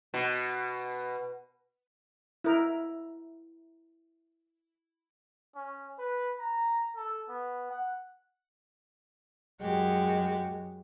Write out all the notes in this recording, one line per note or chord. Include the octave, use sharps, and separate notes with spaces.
B2
E4 A#4
C#4
B4
A#5
A4
B3
F#5
F#2 G#3 F#4 G4